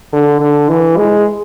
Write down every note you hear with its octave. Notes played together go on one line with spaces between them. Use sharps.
D3
D3
E3
G#3